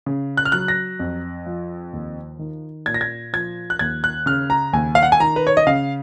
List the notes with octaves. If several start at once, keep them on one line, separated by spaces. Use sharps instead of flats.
C#3
F#6
F6
F#3 F#6
A#6
F2
F3
D#2
D#3
A#2 G#6
A#6
G#6
F3 G#6
F#6
D#2 G#6
F#6
C#3 F6
A#5
D#2 G#5
F5
F#5
G#5
D#3 A#5
B4
C#5
D#5
C#3 F5